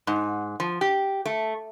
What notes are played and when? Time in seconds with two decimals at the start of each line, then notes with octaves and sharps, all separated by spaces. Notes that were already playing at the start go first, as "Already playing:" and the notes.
0.07 G#2
0.60 F3
0.81 G4
1.26 A3